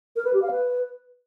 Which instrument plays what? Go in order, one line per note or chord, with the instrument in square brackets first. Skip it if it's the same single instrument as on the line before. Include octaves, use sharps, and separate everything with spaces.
[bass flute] A#4
B4
G4
F5
B4